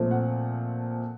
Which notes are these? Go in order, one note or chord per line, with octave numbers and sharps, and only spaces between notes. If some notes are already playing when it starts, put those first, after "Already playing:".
Already playing: A#2 F3 A3 C4
F#5